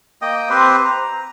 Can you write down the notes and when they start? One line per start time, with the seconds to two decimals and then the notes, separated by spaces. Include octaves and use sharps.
0.22 A#3 D#5 G5 D#6
0.50 C4 G4 B4 C5
0.85 A#5